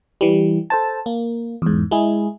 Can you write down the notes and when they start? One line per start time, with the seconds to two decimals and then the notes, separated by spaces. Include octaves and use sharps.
0.21 E3 G3
0.70 A4 C5 A5
1.06 A#3
1.62 E2 G#2
1.91 G#3 E4 G#4